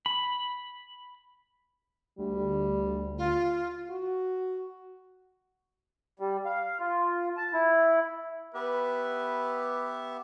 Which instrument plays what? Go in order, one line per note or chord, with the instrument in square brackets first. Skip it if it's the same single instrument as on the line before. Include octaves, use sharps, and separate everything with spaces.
[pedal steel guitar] B5
[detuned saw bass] D2 [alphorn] G3
[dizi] F4
[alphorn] F#4
[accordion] G3
F5
F4
A5
E4
[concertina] B3 G4 E5 [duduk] B4